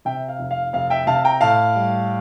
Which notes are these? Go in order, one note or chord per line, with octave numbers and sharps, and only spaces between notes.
C3 E5 G5
F5
F1
F5
F1 F5
E5 G5
C3 F5 A5
G5 A#5
A2 F5 A5
G3